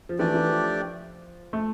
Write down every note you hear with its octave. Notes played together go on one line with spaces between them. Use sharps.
F3
E3 A3 D4 G4 D5
E3
F3
A3